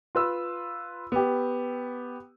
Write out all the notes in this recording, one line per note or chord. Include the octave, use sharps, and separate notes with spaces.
F4 B4 E6
B3 G4